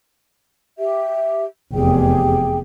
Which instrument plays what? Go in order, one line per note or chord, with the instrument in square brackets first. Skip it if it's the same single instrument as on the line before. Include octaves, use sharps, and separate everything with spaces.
[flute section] G4 E5
[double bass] F1 E2 [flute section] G4 G#4 G5